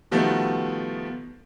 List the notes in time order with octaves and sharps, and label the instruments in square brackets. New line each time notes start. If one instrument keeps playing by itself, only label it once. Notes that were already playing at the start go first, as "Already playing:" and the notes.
[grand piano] B2 D#3 F3 G3 A3 B3